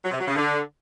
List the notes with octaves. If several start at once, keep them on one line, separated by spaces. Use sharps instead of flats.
F#3
C3
F#3
C#3
D3